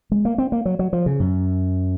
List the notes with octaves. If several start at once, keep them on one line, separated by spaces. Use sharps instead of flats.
G#3
A#3
C4
A#3
F#3
F#3
F3
C#3
F#2